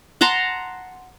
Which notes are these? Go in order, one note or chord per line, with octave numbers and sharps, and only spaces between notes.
F#5 A5 A#5 C6